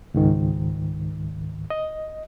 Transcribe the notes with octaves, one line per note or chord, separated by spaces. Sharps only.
C#2 G#2 D#3
D#5